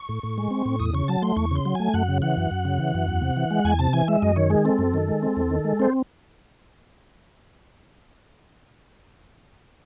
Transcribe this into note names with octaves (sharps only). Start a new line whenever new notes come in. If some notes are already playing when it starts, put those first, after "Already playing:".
Already playing: C#6
A2
A2
G#3
C4
A2
E2 D#6
C#3 C#6
F#3 A5
A3 C6
E2 C#6
C#3 C6
F#3
A3 G#5
F#2 F#5
C#3
E3 F#5
F#2
F#2
C#3
E3
F#2
E2
C3
E3
G#3
E2 G#5
C3 A5
E3 G#5
G#3 E5
F#2 D#5
D#3 C#5
G#3 G#4
C4 A4
F#2
D#3
G#3
C4
E2
D#3
G#3
C4 C5